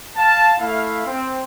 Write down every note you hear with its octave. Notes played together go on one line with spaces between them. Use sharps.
F5 A5
A3 E4 F5
C4